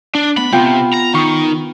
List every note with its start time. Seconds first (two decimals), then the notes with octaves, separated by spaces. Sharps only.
0.15 D4
0.37 B3 B5
0.52 C3 B3 F4 G5
0.94 A#5
1.14 D#3 C#6